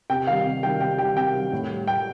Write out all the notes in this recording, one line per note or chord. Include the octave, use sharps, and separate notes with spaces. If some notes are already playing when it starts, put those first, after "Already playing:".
C3 G5
D#3 G3 F5
C3
D#3 G3 G5
C3 G5
D#3 G3 G5
C3 G5
D#3 G3
A2
G3
A2 G5